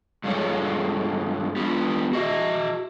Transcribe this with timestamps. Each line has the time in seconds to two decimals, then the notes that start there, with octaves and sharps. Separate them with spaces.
0.24 G2 G#3 F4 A4 C#5
1.56 B3 F4 G4
2.13 F#4 D#5 E5